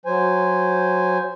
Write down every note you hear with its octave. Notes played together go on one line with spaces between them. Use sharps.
F#3 C5 G#5